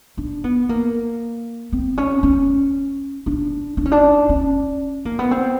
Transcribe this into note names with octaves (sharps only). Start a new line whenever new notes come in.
D4
B3
A#3
C4
C#4
C#4
D4
D4
C#4
D4
C#4
A#3
B3
C4